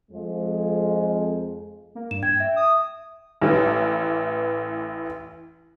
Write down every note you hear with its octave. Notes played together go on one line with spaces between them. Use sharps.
F2 F3 G#3
A#3
G2 E7
G5 G#6
E5
D#6
A1 E3